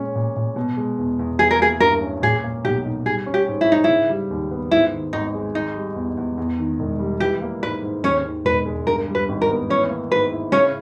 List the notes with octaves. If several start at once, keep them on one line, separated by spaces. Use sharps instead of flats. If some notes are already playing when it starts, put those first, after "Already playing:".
Already playing: A#2 G#3 C#4
A#2
A#2
B2
G#3
E2
E2
E3 G#4
A#4
A#3 G#4
G2 A#4
C#4
A#2 G#4
A#3
B1 G4
D#4
G3 G#4
C#4
G4
G#2
E4
G#2 D#4
C#3 E4
G3
D#2
B3
G#2 E4
D#3
G#1 D#4
G#3
D#3 D#4
G3
E2
E2
E2
D#3
E1
G3
E3 G4
A#3
G#2 B4
G#2
D#2 C#4 C#5
D#3
E1 B4
G#3
G2 A#4
G3
B4
G#1
A#4
B3
E3 C#4 C#5
A#3
G#2 B4
E4
C#3 C#4 C#5